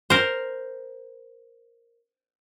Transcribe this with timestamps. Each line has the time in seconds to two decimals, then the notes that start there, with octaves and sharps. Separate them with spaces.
0.10 A#4 C5